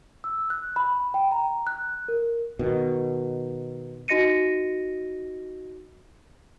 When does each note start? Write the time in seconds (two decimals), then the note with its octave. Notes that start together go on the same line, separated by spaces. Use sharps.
0.24 E6
0.50 F#6
0.76 B5
1.14 G5
1.32 A#5
1.67 F#6
2.08 A#4
2.59 B2 D#3
4.08 D#4 F#4 D#5 A#6 C#7 D#7